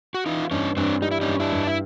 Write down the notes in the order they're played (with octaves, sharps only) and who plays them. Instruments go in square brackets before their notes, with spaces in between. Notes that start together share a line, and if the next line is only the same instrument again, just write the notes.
[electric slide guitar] F#4
[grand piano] E3 [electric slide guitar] D#4 F4
[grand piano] G2 [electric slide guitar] C#4 D#4
[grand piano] G2 [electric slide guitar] C4 D4
[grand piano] G3 [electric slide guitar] D#4
[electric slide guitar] E4
C#4 D#4
[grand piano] G2
[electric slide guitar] D4 E4
[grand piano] G2
[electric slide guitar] E4